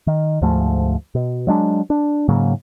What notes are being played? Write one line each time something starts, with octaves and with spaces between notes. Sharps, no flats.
D#3
D2 G#2 F3 A3
B2
F#3 G#3 D4
D4
G#2 C#3 F#3 A#3